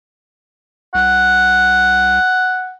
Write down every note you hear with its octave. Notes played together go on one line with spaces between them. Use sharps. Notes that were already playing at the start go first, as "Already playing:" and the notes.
C2 F#5